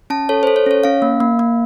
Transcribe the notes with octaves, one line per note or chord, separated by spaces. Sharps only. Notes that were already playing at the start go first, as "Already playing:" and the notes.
C#4 A5
A4 C#5
A4 C5
C#5
C#4 C#5
C#4 F5
A#3
A#3
A#3